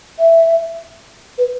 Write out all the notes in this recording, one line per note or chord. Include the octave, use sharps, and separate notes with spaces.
E5
B4